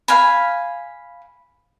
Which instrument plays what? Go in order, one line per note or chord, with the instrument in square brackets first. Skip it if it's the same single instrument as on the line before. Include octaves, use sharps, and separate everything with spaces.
[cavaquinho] F5 G#5 B5